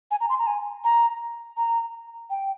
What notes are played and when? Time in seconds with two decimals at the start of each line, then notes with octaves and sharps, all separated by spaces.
0.11 G#5
0.20 A#5
0.29 C6
0.39 A#5
0.47 G#5
0.84 A#5
1.57 A#5
2.30 G5